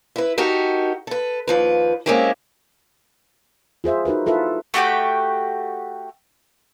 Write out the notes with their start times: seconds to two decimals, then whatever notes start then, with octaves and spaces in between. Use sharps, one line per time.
0.16 E4 B4
0.38 D#4 F#4 G4 A4 A#4
1.07 A4 B4
1.47 D#2 F3 B4
2.06 G#3 A#3 C4 C#4 E4 G4
3.84 F4 G#4 C5 E5
4.05 D#4 F#4 A#4 B4
4.26 E4 F4 A4 B4 E5
4.74 A3 F#4 G4 G5